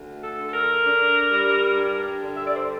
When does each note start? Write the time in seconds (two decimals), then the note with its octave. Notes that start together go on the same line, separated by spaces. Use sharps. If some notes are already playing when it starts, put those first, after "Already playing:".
Already playing: D2
0.24 A4
0.38 D3
0.48 A4
0.54 A#4
0.84 D4
1.29 G3
1.75 G2
2.21 D3
2.37 E5
2.47 D5
2.56 C5